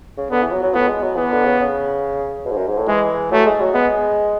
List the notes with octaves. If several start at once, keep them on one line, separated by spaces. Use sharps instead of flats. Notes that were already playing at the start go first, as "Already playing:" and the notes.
C#3
D3 B3
E3
F#3
F#3
A2 B3
G#3
F#3
E3 B3
D3
C#3
C#3
B2
G#2
F#2
G#2
A2
E3 G#3
F#3 A3
G#3
F#3
G#3 B3